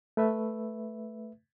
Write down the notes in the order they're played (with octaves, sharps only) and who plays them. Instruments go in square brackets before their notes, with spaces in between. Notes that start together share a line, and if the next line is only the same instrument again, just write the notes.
[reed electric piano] A3 B4 E5